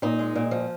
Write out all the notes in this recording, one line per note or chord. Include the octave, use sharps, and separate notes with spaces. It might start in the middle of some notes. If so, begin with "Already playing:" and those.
A#2 D#4
G#3
A#2
F3